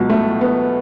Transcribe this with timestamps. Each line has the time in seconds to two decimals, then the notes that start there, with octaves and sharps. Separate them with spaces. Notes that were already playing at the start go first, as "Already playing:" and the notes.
Already playing: C#2 B2 F#3
0.10 A3
0.41 B3